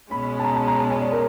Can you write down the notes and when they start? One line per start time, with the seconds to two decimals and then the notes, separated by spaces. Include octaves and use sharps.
0.10 B2 G#3 C#4 B5
0.39 A5
0.45 A#5
0.55 A5
0.67 A#5
0.78 A5
0.90 G#5
1.01 D5
1.12 A#4